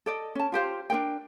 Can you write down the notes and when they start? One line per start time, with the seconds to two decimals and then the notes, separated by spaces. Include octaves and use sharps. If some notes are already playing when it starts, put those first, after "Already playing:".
0.06 A4 D5 D#5
0.35 C#4 A5
0.52 F4 G4 C5 F5
0.90 D4 D#4 A#4 G5